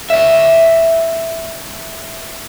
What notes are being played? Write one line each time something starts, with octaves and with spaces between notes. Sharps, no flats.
D5 E5